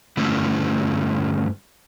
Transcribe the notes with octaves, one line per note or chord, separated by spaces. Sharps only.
G2 D3 A3 C#4 E4